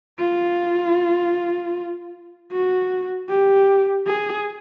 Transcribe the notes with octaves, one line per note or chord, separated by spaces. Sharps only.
F4
F#4
G4
G#4